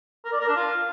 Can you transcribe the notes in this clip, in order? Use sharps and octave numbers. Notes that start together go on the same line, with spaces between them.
A#4
D5
A#4
D4
F4